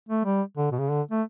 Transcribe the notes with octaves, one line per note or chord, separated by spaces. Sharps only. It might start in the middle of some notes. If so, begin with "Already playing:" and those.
A3
G3
D3
B2
C#3
D3
A3